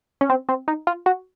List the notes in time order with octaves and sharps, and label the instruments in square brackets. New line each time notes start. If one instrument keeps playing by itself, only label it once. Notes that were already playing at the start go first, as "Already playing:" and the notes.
[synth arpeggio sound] C#4
C4
C4
D#4
F4
F#4